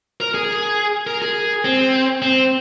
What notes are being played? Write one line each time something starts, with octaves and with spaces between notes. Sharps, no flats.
A#4
G#4
A#4
G#4
C4
C4